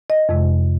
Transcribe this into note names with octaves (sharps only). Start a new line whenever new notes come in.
D#5
F2 C3 G#3